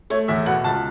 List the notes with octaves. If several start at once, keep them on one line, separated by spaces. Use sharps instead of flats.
A3 C#5
E2 E5
B2 F#5
C#2 A5